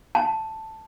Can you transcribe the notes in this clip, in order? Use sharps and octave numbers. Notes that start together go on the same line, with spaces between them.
A5